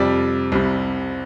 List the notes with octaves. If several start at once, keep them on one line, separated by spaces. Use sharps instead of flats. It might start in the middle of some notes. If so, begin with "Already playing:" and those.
Already playing: F2 C3 G3 D5
C2 C3 G3